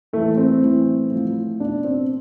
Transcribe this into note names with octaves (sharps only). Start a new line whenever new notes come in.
A2 E3 A3
C4
A2 E3
A2 F3
B2 D4
C4